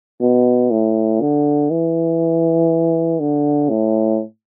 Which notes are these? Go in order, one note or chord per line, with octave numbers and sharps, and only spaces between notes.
B2
A2
D3
E3
D3
A2